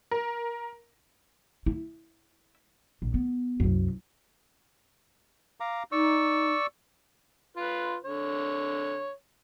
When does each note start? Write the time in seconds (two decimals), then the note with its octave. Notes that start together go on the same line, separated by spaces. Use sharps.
0.11 A#4
1.66 E4
3.02 A#1
3.14 B3
3.60 C2 F#2
5.60 F5 A#5 D6
5.92 D#4 D5 C#6 E6
7.57 F4 B4
8.04 D3 C#5